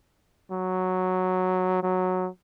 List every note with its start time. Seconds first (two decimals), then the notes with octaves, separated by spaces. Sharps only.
0.51 F#3
1.83 F#3